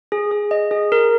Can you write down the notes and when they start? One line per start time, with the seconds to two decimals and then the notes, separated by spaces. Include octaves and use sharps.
0.12 G#4
0.31 G#4
0.51 D#5
0.71 G#4
0.92 A#4